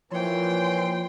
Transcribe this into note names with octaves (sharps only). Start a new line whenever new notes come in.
A#2 E3 F3 C#5 G5 C6